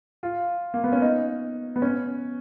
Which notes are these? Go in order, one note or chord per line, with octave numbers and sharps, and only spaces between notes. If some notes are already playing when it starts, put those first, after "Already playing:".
F4
A#3
B3
C#4
D#4
B3
C#4